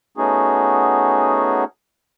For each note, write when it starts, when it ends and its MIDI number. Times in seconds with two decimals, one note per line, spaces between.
0.18 1.64 57
0.18 1.64 59
0.18 1.64 61
0.18 1.64 63
0.18 1.64 66
0.18 1.64 68